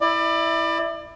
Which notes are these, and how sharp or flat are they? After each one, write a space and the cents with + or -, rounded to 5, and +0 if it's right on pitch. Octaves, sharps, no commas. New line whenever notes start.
E4 +0 D5 +30